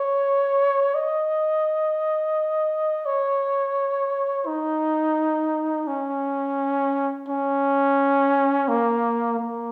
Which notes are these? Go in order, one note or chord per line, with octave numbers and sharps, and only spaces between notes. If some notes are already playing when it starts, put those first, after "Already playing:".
Already playing: C#5
D#5
C#5
D#4
C#4
C#4
A#3
A#3